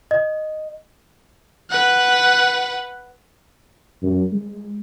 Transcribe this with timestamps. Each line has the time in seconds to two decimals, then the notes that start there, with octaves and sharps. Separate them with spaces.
0.11 D#5
1.70 B4 F#5
4.03 F#2
4.32 G#3